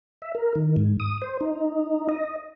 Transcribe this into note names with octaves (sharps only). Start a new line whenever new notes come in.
E5
A#4
D#3
G#2
D#6
C5
D#4
D#5